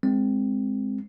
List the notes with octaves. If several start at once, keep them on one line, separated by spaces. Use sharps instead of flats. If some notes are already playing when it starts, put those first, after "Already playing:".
G#3 C4